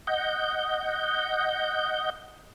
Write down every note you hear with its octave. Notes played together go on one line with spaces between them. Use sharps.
D#5 F#5 G6